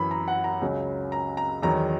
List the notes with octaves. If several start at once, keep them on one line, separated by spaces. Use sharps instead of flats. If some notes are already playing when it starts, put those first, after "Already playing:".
Already playing: F#2 E3 B5
A#5
F#5
A#5
C#2 C#3 F#3
A#5
A#5
E2 D#3 F#3 A#5